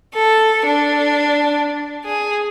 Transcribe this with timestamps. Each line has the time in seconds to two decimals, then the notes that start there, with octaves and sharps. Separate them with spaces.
0.13 A4
0.64 D4
2.04 G#4